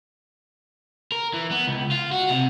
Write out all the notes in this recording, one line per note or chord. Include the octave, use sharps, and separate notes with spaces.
A#4
E3
B3
C#2
F4
F#4
C3